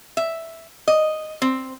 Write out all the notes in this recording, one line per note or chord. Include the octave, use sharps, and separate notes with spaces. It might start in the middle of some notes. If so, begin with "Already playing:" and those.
E5
D#5
C4